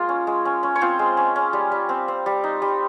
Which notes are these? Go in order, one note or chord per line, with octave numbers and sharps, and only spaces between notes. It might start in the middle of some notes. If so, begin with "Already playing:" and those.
Already playing: G#3 A#3 F4 G#4
C#4
G#3
C#4
C#4
C#5
C4 F4 C5
G#3
C#4
C#4
G3
G3
C4
C4
G3
D#4
G3